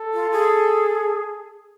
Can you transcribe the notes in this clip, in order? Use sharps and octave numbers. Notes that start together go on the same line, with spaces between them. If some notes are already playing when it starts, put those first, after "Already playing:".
Already playing: A4
F4
G#4